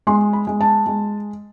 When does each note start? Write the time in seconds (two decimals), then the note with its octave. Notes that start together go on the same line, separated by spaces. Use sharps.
0.07 G#3 C6
0.33 B5
0.47 G#3
0.61 A5
0.86 G#3